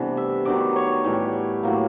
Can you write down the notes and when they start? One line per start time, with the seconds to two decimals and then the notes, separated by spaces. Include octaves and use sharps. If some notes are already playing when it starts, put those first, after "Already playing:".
Already playing: C3 E3 G3 A3 B3 D4
0.17 E5
0.45 D#3 F#3 B3 D#4 D5
0.76 C#5
1.04 A2 E3 G3
1.63 A2 F#3 A#3